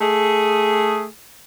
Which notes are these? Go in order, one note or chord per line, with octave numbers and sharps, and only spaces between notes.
A3 G#4